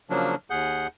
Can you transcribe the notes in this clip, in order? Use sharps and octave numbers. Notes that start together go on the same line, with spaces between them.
C#3 F3 F#3 A#3 D4
D#2 G#4 F#5 G6